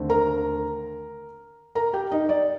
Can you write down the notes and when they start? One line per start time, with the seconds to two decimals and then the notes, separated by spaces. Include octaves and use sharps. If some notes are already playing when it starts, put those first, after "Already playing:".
Already playing: D#2 D3 A3 C4
0.09 A#4 A#5
1.75 A#4 A#5
1.93 G4 G5
2.11 D#4 D#5
2.29 D5